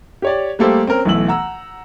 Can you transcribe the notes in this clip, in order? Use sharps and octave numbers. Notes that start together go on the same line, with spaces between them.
G4 C#5 D5
G3 A3 A#3 G4 A4 C5
C4 C#4 A#4
B1 E3 A3 E6 F#7
F#5 A#5 E6